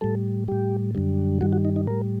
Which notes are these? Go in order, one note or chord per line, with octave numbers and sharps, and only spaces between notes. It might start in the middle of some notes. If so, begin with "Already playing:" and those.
A2 G3 A4
A2 G3 G4
F#2 D3 G3
G2 D#3 G3 F#4
F#4
D#4
D#4
A2 G3 A#4